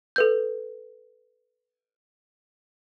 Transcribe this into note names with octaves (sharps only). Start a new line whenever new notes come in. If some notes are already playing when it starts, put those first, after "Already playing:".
A4 B4 G6